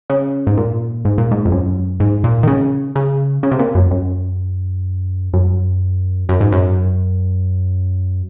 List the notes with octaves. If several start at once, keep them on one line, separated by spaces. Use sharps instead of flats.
C#3
G#2
A#2
G#2
A#2
G#2
F2
F#2
G#2
A#2
D#3
C#3
C#3
C#3
C3
A#2
F#2
F#2
F#2
F#2
G#2
F#2